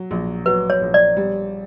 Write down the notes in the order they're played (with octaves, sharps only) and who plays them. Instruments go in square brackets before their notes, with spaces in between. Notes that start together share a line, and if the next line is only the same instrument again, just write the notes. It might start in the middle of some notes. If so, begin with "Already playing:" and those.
Already playing: [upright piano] F#3
A#1
[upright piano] F#3 [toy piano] B4
[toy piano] C#5
[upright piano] A#1
[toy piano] D5
[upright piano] G3